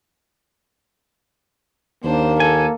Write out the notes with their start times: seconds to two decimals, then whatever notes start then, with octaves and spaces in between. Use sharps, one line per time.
2.04 D#2 A#3 D4 C5
2.40 A4 G#5